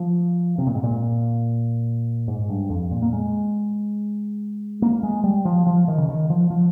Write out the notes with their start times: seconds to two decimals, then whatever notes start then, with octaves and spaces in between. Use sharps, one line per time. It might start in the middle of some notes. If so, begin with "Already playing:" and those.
Already playing: F3
0.58 C3
0.67 A#2
0.75 G#2
0.83 A#2
2.28 G#2
2.49 G2
2.70 F2
2.91 A#2
3.02 A#3
3.13 G#3
4.82 A#3
5.03 G#3
5.24 G3
5.45 F3
5.66 F3
5.88 D#3
5.98 C#3
6.09 D#3
6.30 F3
6.50 F3